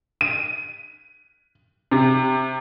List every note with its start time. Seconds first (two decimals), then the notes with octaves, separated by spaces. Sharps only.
0.21 D#7
1.91 C3